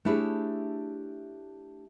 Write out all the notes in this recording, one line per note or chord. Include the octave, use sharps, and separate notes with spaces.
A3 D4 E4 G4 G#4 C#5